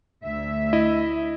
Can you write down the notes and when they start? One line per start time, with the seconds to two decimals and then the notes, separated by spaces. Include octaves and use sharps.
0.24 D2 E5
0.73 E4 D#5